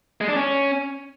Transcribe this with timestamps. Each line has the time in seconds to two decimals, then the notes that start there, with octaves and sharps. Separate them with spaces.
0.21 G#3
0.29 D4
0.36 C#4